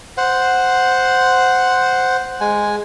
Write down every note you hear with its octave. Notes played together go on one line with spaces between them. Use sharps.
C5 F#5
G#3 G#5